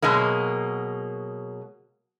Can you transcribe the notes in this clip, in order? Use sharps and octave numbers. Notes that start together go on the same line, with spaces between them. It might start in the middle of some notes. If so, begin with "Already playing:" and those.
B2 F#3 G#3 A#3